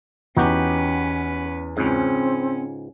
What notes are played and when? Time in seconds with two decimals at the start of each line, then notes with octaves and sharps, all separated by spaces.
0.37 E2 C#4 D#4 F#4 G4 B4
1.77 C#2 G#2 C4 C#4